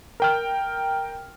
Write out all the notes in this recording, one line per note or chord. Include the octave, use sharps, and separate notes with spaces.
A#4 G5 F6